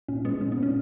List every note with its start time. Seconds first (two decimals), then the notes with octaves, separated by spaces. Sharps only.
0.08 A#2 C#4
0.25 G#3 B3
0.41 A#2 C#4
0.52 B3
0.57 A#2
0.63 C#4